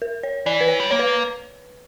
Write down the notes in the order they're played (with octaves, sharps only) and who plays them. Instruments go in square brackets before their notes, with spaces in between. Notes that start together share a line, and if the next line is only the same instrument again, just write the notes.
[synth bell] A#4
C#5
[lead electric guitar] E3 [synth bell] D5
[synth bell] B4
C#5
[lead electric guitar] G3
[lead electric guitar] A#3 [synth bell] C#5
[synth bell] B4